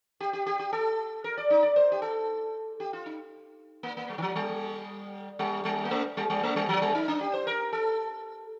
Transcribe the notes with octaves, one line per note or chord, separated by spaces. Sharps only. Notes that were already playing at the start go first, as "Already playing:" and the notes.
G4
G4
G4
G4
A4
A#4
D5
D#4
D5
C5
G4
A4
G4
F4
D#4
A#3
A#3
G3
D#3
F3
G3
G3
G3
A#3
A3
G3
G3
A3
G3
F3
G3
D#4
D4
G4
C5
A#4
A4